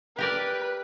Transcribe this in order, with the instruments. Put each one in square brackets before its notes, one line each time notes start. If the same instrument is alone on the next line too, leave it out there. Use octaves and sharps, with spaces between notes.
[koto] G4 A#4 D5 [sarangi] B4